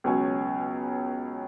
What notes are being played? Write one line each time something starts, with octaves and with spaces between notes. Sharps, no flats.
C#2 B2 F#3 C#4 G#5